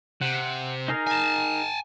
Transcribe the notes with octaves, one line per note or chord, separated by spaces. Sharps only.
C3 F#5
D#4 G#4 A#4
G#5 A5